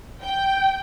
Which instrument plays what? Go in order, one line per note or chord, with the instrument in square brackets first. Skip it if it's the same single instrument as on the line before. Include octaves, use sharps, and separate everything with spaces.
[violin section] G5